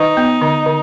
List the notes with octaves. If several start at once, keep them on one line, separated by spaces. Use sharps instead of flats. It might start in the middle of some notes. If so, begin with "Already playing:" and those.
Already playing: D#3 D#4
B3
D3
D3